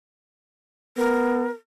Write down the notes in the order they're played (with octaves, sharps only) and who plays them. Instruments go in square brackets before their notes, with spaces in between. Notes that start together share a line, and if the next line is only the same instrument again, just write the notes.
[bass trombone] B3 [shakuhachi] A#4